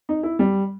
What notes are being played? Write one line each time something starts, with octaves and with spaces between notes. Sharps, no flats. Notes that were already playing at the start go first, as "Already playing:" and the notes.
D#4
E4
G3